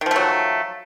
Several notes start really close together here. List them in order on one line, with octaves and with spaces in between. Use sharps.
D#3 F3 A3 F#3